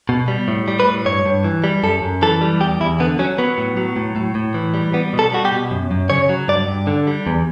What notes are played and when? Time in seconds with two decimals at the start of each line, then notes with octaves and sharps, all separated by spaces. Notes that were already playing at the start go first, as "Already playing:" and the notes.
0.09 B2
0.28 G3
0.48 A2
0.68 G3
0.80 B4
0.86 A2
1.06 G2 C#5
1.26 G2
1.44 E3
1.64 G3
1.83 F#2 A4
2.02 F#2
2.22 E3 A4
2.41 G3
2.60 E2 G4
2.80 E2 E4
3.00 D3 B3
3.19 F#3 C#4
3.38 F#3 B3
3.58 A2
3.77 F#3
3.96 A2
4.16 A2
4.35 A2
4.54 E3
4.74 G3
4.93 G3 B3
5.13 B2
5.19 A4
5.32 G3 F#4
5.45 G4
5.52 B2
5.71 F#2
5.91 F#2
6.10 C#3 C#5
6.29 F#3
6.48 G2 D5
6.68 G2
6.87 D3
7.07 G3
7.27 E2